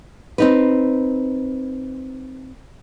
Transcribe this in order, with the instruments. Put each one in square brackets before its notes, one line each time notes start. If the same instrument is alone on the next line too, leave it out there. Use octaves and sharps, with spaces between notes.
[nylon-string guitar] C4 D#4 B4